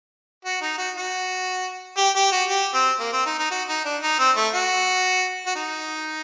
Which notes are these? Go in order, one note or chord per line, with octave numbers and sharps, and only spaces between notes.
F#4
D#4
F#4
F#4
G4
G4
F#4
G4
C4
A#3
C4
D#4
D#4
F#4
D#4
D4
D#4
C4
A3
F#4
F#4
D#4